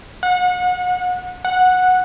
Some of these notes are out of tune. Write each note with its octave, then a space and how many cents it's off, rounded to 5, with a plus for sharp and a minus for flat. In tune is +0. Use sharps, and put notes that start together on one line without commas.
F#5 -30
F#5 -10